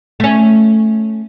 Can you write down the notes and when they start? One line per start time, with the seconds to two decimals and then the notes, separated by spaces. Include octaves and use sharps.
0.20 A3 C#4